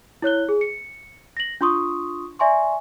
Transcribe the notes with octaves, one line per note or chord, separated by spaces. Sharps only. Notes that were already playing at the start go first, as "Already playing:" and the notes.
E4 C#5 F#6 G7
G#4
C#7
A#6 F#7
D4 F4 C6 C#6 D#6
D5 E5 G#5 C6 C#6